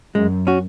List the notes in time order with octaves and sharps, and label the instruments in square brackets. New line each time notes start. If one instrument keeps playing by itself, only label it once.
[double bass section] F#2 [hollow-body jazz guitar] G#3
[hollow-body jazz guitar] C#4 F#4